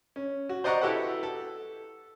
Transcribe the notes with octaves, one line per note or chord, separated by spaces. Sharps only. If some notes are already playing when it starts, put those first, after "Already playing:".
C#4
F#4
C5 D5 D#5 F#5 A#5 C#6
E4 F#4 G4 A4 B4 F#5
A4